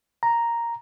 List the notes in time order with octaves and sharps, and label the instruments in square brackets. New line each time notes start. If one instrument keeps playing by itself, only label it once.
[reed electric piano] A#5